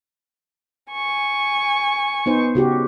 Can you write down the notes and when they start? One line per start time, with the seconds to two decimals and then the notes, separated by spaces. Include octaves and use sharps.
0.91 G#5 C#6
2.26 B3 D#4 C5
2.55 C#3 F#4 G4